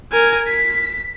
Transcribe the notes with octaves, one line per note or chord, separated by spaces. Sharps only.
A#4 G#5
B6